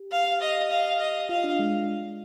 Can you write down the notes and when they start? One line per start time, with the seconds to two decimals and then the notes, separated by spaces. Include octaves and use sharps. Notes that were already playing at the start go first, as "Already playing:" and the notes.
Already playing: G4
0.11 F5
0.41 D#5
0.71 F5
0.99 D#5
1.29 F4 F5
1.44 D4
1.59 G#3